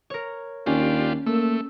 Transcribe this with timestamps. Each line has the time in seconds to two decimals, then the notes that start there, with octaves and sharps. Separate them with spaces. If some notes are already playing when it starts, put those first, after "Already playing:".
0.10 A#4 C#5
0.66 D#2 C#4 D4 F4 G4
1.26 A3 A#3 E6